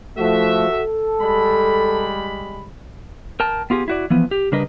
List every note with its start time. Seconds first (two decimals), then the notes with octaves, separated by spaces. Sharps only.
0.17 F3 A3 F#4 E5
0.69 A4
1.21 G3 G#3 B5
3.40 A#4 G5 A5
3.70 B3 F4 G4 G#4
3.88 E4 F#4 D5
4.10 E3 F3 B3
4.31 G4
4.52 C#3 G3 D4 A#4 B4 D#5